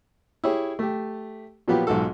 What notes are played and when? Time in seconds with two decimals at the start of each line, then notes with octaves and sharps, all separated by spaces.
0.44 E4 G4 G#4 C#5
0.79 A3 G4
1.68 A#2 F3 F#3 B3 F4 G4
1.87 B1 G#2 F4 F#4 A4